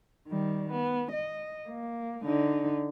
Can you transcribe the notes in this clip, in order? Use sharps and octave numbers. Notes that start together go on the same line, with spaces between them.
D#3 G3
B3
D#5
A#3
D3 D#4